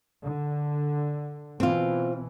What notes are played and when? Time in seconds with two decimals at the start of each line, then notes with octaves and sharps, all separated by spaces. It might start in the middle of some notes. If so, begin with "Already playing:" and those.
0.23 D3
1.60 B2 E3 C4 F4